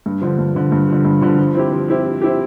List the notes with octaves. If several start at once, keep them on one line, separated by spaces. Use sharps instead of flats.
G2
D3 F3
G2
D3 F3
G2
D3 F3
G2
D3 F3
F3
C4 E4 G4
F3
C4 E4 G4
F3
C4 E4 G4